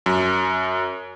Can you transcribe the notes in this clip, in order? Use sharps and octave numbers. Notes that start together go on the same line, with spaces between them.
F#2